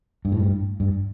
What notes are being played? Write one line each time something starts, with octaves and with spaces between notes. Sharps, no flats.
G2
A2
G2
G2